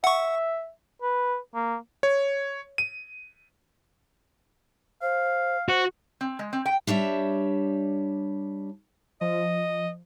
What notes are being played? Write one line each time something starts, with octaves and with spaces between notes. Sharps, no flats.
E5 F#5 C#6
B4
A#3
C#5
D#7
C5 F5
F#4 C5
C4
G#3
C4
G5
G3 D4 C#5 E5
F3 D#5